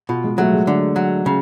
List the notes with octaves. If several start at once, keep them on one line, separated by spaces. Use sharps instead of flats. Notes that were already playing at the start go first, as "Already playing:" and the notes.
B2 F4
G#3
F#3 A3
G#3
D3
F#3
C#3